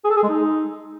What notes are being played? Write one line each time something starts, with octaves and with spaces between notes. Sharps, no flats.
G#4
A4
G#4
G#3
D#4